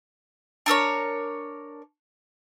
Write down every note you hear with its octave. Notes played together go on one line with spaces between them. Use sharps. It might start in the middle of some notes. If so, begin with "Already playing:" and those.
D4 A4 A#4 C#5